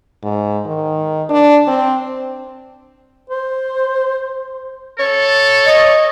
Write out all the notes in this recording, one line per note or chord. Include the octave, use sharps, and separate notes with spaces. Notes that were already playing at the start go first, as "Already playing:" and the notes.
G#2
D#3
D4
C4
C5
A4 C#5
D#5